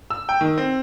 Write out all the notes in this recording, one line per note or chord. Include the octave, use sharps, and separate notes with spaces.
E6
G5
D#3
C4